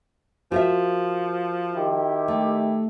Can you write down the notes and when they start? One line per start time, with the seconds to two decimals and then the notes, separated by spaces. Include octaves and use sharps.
0.52 F3 F#4 A#4 E5
1.74 D#3 E4 G4
2.28 A3